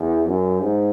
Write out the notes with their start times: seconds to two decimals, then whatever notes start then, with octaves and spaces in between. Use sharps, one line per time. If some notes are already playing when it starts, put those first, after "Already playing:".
Already playing: E2
0.28 F#2
0.62 G#2